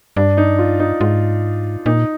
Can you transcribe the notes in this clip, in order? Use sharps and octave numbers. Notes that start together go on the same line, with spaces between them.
G2 D4
D#4
F4
D#4
G#2 F4
A#2 D#4